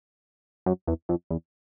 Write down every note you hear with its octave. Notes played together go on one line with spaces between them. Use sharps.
F#2
E2
F2
E2